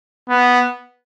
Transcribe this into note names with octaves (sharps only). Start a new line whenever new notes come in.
B3